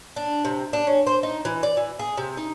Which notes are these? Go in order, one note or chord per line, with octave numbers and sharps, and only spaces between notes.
D4
C3
D4
C#4
C5
D#4
E3
D5
E3
G#4
C3
D#4